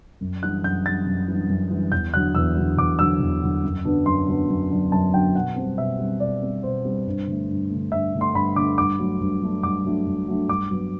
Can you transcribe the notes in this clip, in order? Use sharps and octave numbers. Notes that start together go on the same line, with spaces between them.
F#2
E3 G3 D4 F#6
F#2 G6
E3 G3 D4 A6
F#2
E3 G3 D4
F#2
E3 G3 D4
E2 G6
D3 F#3 F#6
E2 E6
D3 F#3
E2 D6
D3 F#3 E6
E2
D3 F#3
F#2
D3 F#3 B3 D4
F#2 C6
D3 F#3 B3 D4
F#2
D3 F#3 B3 D4
F#2 A5
D3 F#3 B3 D4 G5
B2 F#5
G3 C4
B2 E5
G3 C4
B2 D5
G3 C4
B2 C5
G3 C4
G2
D3 A3
G2
D3 A3
G2 E5
D3 A3
C6
G2 B5
D3 A3 D6
G2 D6
F#3 A3 D4
G2
F#3 A3 D4
G2 D6
F#3 A3 D4
G2
F#3 A3 D4
G2 D6
F#3 B3